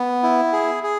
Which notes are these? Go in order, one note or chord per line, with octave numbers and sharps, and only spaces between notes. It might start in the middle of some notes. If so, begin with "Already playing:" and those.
Already playing: B3
E4
G#4
G#4